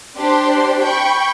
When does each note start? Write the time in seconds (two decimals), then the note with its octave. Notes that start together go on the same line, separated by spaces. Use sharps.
0.18 D4 G4 C5 C6
0.82 G5 B5 C#6 G6